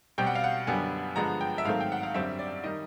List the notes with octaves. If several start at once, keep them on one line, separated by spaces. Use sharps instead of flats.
B2 G3 C4 G5
F#5
F5
F#5
F#2 D3 G3 B3 G#5
G2 D3 F3 G#3 B3 A#5
G5
E5
G#2 D#3 F#3 A3 C4 F5
G5
F#5
F5
F#2 D3 G3 C4 E5
D5
D#3 G3 D#5